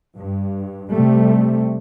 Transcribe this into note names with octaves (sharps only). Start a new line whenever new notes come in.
G2
C3 G3 A3